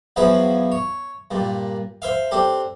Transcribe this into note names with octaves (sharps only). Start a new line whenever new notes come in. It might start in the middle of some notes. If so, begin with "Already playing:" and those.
E2 F3 F#3 G#4 B4 E5
C#5
G2 A#2
C5 E5 F5
C4 D4 G4 A4